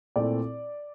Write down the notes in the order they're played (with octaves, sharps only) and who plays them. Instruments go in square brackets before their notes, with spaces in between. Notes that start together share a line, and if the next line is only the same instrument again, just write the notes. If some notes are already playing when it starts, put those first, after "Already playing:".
[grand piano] A#2 A3 C4 E4 [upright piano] D5